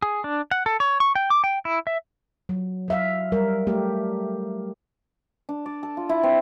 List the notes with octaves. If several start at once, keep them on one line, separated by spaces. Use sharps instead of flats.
G#4
D4
F#5
A4
C#5
C#6
G5
D6
G5
E4
E5
F#3
F#3 E5 F5
G3 A#4
A3 G4
D4
D5
A4
F4
E4
C4